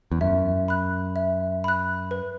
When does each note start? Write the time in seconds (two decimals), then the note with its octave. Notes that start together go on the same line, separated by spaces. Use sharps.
0.12 E2
0.21 F#2 E5
0.68 B5 F#6
1.16 E5
1.64 B5 F#6
2.11 B4